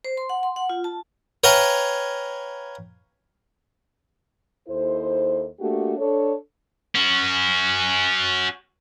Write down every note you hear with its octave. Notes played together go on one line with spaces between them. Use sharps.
C5
C6
F#5
C6
F#5
F4
A5
B4 C#5 F5 G5 G#5 A#5
D#2 E4 A4 C5
A3 A#3 D4 F#4 G4
D4 A4 C#5
C#4 F#4